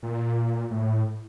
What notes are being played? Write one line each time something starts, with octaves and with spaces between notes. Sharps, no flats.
A#2
A2